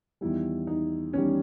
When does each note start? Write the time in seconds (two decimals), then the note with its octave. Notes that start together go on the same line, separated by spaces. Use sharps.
0.21 E2 D#3 G3 E4
0.67 D#4
1.13 E2 D#3 G3 C#4